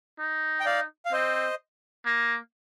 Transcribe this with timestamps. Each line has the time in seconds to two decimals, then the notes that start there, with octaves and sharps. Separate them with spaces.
0.19 D#4
0.60 G5
0.66 D5 F5
1.05 F5
1.12 C4 C5 D#5
2.06 A#3